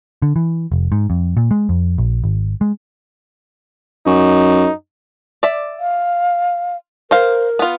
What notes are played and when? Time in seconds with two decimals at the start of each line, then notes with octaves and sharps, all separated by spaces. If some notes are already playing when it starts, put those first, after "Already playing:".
0.22 D3
0.36 E3
0.72 F1
0.92 G#2
1.10 F2
1.37 A#2
1.51 G#3
1.69 F2
1.98 A#1
2.24 G#1
2.61 G#3
4.06 F#2 D#4
5.43 D5 E5
5.79 F5
7.11 A#4 C5 F5
7.59 B3 F4